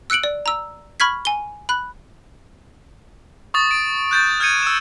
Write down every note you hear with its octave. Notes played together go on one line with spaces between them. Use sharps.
E6 F#6 C#7 D7 F#7
D5
A#5 E6
B5 C#6 F6 G#6 B6
G#5 G7
B5 F#6
C#6 D#6 A6
D7
F#6 G6 A6
F6 G6 G#6 C#7 D#7
E6 E7